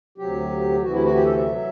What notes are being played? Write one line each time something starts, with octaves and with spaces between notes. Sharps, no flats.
D2 C3 F#3 G4
D2 C3 E3 F#4
E4
F#4
G4
A4
E5
F#3